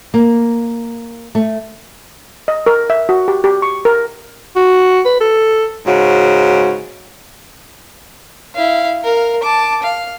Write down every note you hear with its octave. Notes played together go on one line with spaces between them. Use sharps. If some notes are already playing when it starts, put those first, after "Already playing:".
A#3
A3
D#5
A#4
E5
F#4
G4
G4
C#6
A#4
F#4
B4
A4
G#2 C#3 F#4
E4 F5
A#4 F5
A5 D6
F5